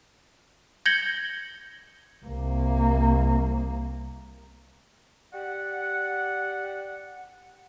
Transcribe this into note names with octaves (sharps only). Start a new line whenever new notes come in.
G6 G#6 A#6 C#7 F#7 G7
C2 A#3
G4 D5 F#5